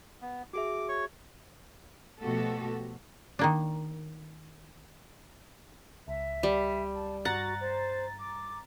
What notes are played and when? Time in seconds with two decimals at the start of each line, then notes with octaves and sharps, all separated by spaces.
0.22 B3
0.53 F#4 G#4 E5 D6
0.89 C#5 C#6
2.21 B2 F3 A3 F#4 G4 A4
3.39 D#3 A#3 D4
6.08 C#2 E5
6.43 G3
6.95 A5
7.25 G2 F#4 F#5 A#5 A6
7.61 C5
8.19 D6